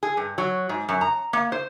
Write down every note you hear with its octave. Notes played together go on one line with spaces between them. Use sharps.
G#4
G2
F#3
G#2
F#2
A#5
A#3
C5